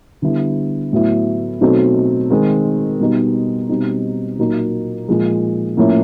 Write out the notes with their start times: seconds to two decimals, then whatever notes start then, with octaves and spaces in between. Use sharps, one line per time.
0.22 D3 G3 B3 E4
0.93 A2 F#3 B3 E4
1.61 B2 F#3 A3 C4 D#4
2.30 D#3 G#3 C4
3.00 B2 G3 B3 D#4
3.69 B2 G3 C4 D#4
4.39 A#2 F#3 A#3 D#4
5.08 A#2 F3 G#3
5.77 A2 F3 A#3 C#4 E4